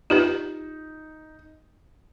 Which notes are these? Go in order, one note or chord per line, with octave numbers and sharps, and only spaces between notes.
D#4 F4 G4 B4